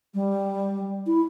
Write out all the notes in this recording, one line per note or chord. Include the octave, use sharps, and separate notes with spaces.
G3
E4